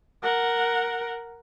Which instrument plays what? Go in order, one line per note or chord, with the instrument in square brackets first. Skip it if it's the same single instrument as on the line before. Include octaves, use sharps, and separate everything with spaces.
[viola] A#4 F#5